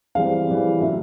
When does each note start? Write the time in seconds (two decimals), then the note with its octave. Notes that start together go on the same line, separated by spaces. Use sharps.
0.15 C#3 E3 G3 C4 F5
0.47 C#3 E3 G3 C4
0.80 A2 F#3 A3 C#4 E5